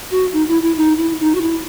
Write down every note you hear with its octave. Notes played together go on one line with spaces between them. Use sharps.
F#4
D#4
E4
E4
D#4
E4
D#4
F#4
E4